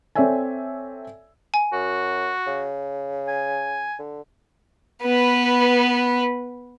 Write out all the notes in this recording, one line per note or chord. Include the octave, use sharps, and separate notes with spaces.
C4 A4 C#5 D5 E5 G#5
G#5
F#2 F#4
C#3
G#5
D3
B3 B4